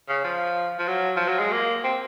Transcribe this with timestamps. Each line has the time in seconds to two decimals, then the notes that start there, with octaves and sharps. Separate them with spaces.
0.09 C#3
0.24 F3
0.79 F3
0.88 F#3
1.17 F3
1.28 F#3
1.39 G#3
1.52 A#3
1.84 C4